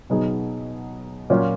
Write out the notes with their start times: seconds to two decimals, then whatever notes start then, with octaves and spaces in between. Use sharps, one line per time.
0.10 B2 F#3 B3 D#4 G#4
1.30 A#2 F#3 C#4 F4